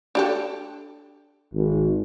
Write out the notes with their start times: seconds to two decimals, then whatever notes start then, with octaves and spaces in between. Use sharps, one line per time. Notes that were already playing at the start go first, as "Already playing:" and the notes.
0.15 D4 G4 A4
1.54 G#1